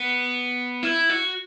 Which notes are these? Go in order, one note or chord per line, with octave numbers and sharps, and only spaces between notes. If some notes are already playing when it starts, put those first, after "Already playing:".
Already playing: B3
E4
F#4